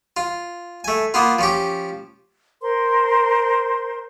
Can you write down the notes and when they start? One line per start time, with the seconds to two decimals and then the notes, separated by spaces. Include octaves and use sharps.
0.17 F4
0.84 A3 G#5
1.14 A#3 B3 F4
1.39 F3 C#4 G4
2.61 A#4 C5 C6